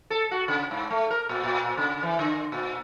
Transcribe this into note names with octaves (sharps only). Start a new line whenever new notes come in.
A4
F#4
C#3
G#2
A3
A#4
A#2
A#2
C#3
E3
D3
A#2